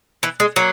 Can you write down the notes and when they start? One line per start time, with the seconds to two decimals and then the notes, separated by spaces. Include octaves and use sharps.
0.23 E3
0.40 G#3
0.56 F#3 A#3